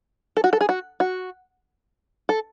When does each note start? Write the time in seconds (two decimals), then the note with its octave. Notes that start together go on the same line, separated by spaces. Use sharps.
0.37 A4
0.44 F#4
0.53 A4
0.61 G#4
0.69 F#4
1.00 F#4
2.29 A4